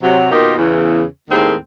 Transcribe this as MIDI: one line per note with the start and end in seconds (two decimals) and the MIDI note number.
0.02 0.29 48
0.02 0.29 54
0.31 0.54 47
0.31 0.54 51
0.31 0.54 58
0.31 0.54 63
0.31 0.54 65
0.31 0.54 67
0.57 1.03 40
0.57 1.03 49
0.57 1.03 52
1.30 1.54 39
1.30 1.54 45
1.30 1.54 51
1.30 1.54 56
1.30 1.54 58
1.30 1.54 60